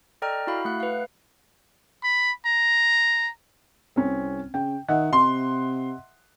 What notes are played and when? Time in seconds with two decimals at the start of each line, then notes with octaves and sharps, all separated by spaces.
0.22 A4 D5 D#5 G5 A#5 F6
0.47 E4 F#4 F5 B5
0.65 A3 F#5 F#6
0.80 B4 F5
2.03 B5
2.46 A#5
3.96 C2 C4 C#4
4.54 C#3 G5
4.88 D#3 D#5 E5 F#5
5.13 C3 C6